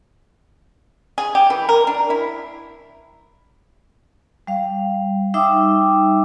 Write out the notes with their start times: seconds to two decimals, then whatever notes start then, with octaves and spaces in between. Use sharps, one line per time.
1.18 G#4
1.35 G4
1.50 E3
1.69 A#4
1.87 D4
2.10 E4
4.47 G3 F5
5.34 G3 D#4 E5 G5 D6 E6